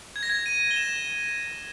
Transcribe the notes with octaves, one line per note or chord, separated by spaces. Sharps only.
G#6
A#6
G#6
D#7
G7
E7